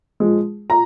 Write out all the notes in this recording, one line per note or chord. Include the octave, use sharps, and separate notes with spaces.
A#2 F3 G#3
A#2 A#5